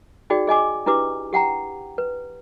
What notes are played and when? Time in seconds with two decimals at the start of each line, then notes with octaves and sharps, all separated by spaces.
0.30 D#4 F#4 G#4 D5 G5
0.47 G#4 D#5 G#5 D6
0.86 D4 E4 G4 B4 D6
1.33 G4 F#5 G5 A#5
1.98 B4